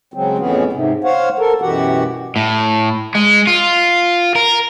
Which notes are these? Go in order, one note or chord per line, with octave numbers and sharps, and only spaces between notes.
C#3 F#3 G#3 C4
F2 A2 E3 B3 C#4 G#4
G#2 C3
C5 C#5 F5 F#5
A4 A#4
F#2 B2 E3 F#4 G4 F#5
A2
G#3
F4
A#4